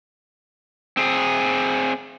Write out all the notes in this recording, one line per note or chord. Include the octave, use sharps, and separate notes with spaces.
C4 G#4